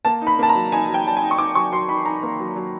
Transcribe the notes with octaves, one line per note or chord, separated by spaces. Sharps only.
A#3 A5
D#4
B5
A#3 A5
A#5
F#3
D#4 G#5
F#3
G5
F#3 A5
G#5
D#4
C#6
D#4 D6
F#3 C#6
F#3 C6
D#4 B5
D#4 A#5
A#3
F#3
F#3